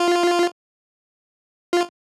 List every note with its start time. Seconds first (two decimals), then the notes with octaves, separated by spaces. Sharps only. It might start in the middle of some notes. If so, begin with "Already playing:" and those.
Already playing: F4
1.73 F4